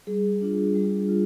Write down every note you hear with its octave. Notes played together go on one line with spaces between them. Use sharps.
G3 G#4
D4 F4
G3
F4